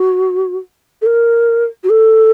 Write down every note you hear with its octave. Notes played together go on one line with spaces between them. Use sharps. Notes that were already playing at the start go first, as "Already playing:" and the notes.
Already playing: F#4
A4
A#4
F#4
A4